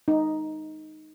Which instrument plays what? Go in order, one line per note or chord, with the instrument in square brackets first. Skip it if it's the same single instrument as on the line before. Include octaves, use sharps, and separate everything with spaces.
[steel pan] D#4